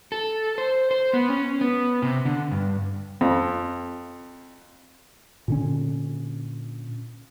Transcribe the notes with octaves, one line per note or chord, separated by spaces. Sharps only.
A4
C5
C5
B3
C#4
B3
C3
D3
G2
F2
A#2 D3 C#4